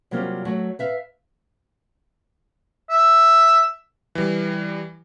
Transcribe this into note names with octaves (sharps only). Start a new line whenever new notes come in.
C3 F#3 G3 A#3 C4 F4
F#3 A3 F#4
B4 E5 F5
E5
E3 G3